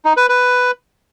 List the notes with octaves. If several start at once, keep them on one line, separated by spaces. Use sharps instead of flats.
D#4
B4
B4